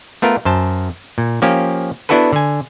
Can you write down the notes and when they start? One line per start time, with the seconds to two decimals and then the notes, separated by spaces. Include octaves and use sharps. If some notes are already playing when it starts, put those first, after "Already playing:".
0.22 A3 B3 F4 A#4
0.45 F#2 C5 A5
1.18 A#2
1.42 F3 A#3 C#4 G4
2.09 B3 D4 E4 F#4 A4 B4
2.33 D3 G#5